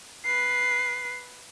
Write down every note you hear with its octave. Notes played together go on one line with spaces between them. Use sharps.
B4 C7